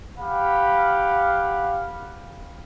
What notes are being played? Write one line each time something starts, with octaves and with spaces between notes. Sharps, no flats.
G4 F5 F#5 B5